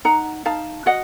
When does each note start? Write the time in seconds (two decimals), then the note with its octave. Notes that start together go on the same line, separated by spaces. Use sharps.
0.05 D#4 F#5 A#5
0.45 D#4 F5 A5
0.86 F#4 D#5 F#5